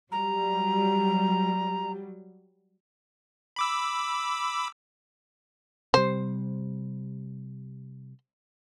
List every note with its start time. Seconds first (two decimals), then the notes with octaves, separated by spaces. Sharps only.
0.11 F#3 G3 A#5
3.56 B5 D6 E6
5.94 C3 G3 C5